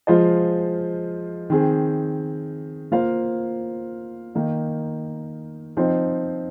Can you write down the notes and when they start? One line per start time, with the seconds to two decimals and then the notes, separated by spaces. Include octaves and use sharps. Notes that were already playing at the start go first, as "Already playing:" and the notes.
0.07 F3 G#3 F4 C5 D#5
1.50 D#3 C4 G#4
2.92 A#3 F4 C5 F5
4.35 D#3 A#3 D#4
5.77 F3 C4 D#4 C5